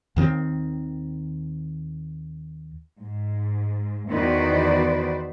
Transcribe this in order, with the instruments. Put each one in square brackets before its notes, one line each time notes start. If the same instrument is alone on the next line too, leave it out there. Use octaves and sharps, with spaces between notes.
[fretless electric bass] D#2 D#3 E3 C4
[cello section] G#2
E2 D#3 F#4 B4 C5 D5